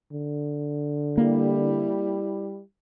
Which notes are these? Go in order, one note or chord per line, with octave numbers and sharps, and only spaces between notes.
D3
G3 A#3 E4